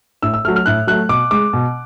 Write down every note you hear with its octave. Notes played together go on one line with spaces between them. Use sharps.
A2 E6
E6
F#3 A3 F6
F6
A2 F#6
F#3 A3 F#6
B2 D6
G#3 D6
B2